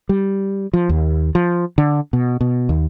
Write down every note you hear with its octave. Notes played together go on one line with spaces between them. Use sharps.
G3
F3
D#2
F3
D3
B2
B2
D#2